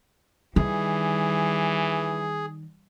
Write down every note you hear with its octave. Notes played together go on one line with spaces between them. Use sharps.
D#3 E3 G3 G#4